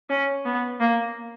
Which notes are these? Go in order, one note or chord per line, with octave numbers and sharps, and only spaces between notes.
C#4
B3
A#3